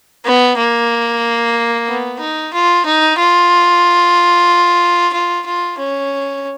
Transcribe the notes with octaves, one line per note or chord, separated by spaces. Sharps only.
B3
A#3
B3
D#4
F4
D#4
F4
F4
F4
C#4